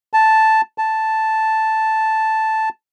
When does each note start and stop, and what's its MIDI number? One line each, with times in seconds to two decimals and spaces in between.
0.13 0.61 81
0.78 2.69 81